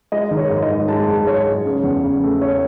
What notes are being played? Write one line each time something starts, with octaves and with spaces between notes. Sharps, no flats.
G#3 D#5
D#3
C#5
G#2
D#5
G#3
G#3 A5
G#2
G#3 C#5
G#3
C#3
E2
C#3
A3
A3 C#5